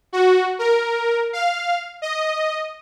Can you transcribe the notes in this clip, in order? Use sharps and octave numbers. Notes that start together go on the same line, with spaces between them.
F#4
A#4
F5
D#5